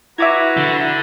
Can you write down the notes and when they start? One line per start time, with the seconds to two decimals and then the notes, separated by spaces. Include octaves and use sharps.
0.18 E4 F#4 B4 E5 A#5 D6 G#6
0.57 D3